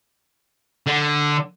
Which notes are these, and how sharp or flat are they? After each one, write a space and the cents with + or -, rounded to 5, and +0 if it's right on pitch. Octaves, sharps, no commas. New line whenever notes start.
D3 +5